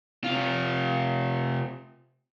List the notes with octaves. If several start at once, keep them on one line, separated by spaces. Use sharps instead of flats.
C3 F4